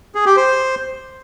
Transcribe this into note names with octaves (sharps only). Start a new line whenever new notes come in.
G#4
G4
C5